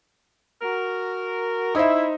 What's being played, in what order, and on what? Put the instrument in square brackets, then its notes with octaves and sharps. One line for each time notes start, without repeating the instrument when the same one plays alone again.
[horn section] F#4 A#4
[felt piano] D#4 C5 E5 [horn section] E4